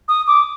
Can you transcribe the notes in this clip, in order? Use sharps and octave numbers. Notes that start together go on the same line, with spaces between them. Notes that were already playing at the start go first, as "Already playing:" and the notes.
D#6
D6